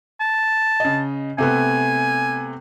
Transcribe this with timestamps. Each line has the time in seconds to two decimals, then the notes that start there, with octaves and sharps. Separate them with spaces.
0.20 A5
0.80 C#3 D#5
1.38 C3 A3 B3 G#5